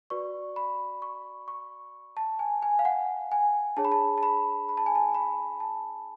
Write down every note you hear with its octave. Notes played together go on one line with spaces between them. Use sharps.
F#4 B4 D5 C#6
B5
C#6
C#6
A5
G#5
G#5
F5
F#5
G#5
D4 G#4 C#5 A5
B5
A5
A5
B5
B5
A5
G#5
A5
B5
A5